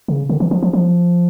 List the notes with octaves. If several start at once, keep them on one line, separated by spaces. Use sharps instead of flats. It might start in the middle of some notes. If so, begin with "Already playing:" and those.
C#3
D3
E3
F3
F3
F3